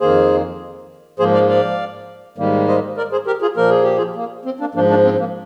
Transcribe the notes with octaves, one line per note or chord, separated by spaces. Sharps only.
F2 D#3 A#3 G#4 C5
G#2 F3 A#3 G#4 C5
D5 F5
D5 F5
G#2 D#3 G3 A#3
C5 D#5
A#4 D5
G#4 C5
G4 A#4
F4 G#4
A#2 F3 A#3 A#4
G#4
G4
F4 G#4
A#3
C4
A#3 D4
G#2 F3 A#3 D4
A#3 D4
C4
A#3